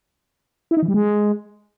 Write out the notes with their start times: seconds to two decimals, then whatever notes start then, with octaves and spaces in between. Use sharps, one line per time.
0.71 E4
0.77 D#4
0.83 E3
0.88 G3
0.94 G#3